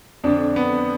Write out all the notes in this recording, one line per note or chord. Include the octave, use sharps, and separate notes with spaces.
F2 D3 D4
B3